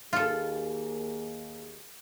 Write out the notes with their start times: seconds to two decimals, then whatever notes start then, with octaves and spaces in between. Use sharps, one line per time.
0.13 D#2 A#3 F4 G#4 A4